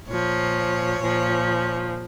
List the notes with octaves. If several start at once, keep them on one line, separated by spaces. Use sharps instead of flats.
A#2 F3 C#5
A#2 F3